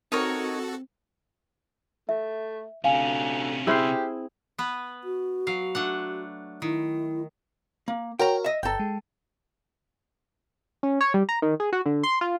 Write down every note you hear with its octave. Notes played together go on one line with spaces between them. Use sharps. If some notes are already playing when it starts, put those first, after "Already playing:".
C4 D#4 F#4 A4 A#4 C#5
A3 E5
D2 C3 C#4 F5 G#5
C4 E4 G4 G#4 E6 F6 C7
B3 B4
F#4
F#3 F5
A3 D4 F#5
D#3 E4
A#3
F#4 A#4 C#5 G5 A#5
D#5 E5
G1 A4 G5 A#5
G#3
C#4
C#5
G3
A#5
D#3
G#4
F#4
D3
C6
F4